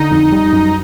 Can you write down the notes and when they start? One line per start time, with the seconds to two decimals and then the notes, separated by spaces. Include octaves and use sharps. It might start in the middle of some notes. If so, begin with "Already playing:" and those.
Already playing: D3 D#4
0.11 F2
0.32 G3
0.53 F#2